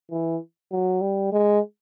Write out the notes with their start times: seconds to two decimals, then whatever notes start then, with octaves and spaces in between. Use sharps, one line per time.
0.11 E3
0.71 F#3
1.01 G3
1.32 G#3